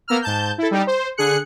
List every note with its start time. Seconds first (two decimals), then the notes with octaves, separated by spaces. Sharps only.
0.08 A#3 B3 A#5 E6 F6
0.22 G#2 A5 G6
0.58 E4 A4
0.71 G3 D#4 G4
0.87 C5
1.17 D3 G#4 F#6 C#7